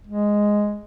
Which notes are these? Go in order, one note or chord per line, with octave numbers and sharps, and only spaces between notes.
G#3